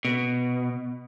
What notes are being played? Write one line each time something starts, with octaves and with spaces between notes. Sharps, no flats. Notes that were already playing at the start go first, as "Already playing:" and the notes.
B2